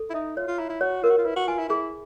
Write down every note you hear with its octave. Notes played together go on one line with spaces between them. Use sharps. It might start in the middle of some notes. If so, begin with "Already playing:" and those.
Already playing: A4
E4
D#4 E5
F4 C#5
F4
E4 A#5
E4
F#4 C#5
F4 A#4
F#4
F4
E4 B4
F#4
F4 G#5
E4
E4 G#4